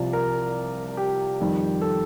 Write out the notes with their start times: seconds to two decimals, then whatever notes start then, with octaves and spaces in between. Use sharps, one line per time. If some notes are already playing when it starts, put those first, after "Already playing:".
Already playing: C2 C3 F3 D5
0.13 A#4
0.97 G4
1.40 F2 D#3 G3
1.81 A4